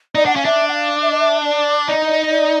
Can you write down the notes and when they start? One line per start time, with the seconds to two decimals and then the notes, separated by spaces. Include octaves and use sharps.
0.15 D#4 D5
0.25 D4 F#5
0.34 C#4 F5
0.45 D4 E5
0.68 F#5
0.73 F5
1.02 E5
1.11 D#5
1.19 E5
1.45 D5
1.88 D#4 D5
1.99 D#5
2.09 D5
2.20 D#5
2.30 D5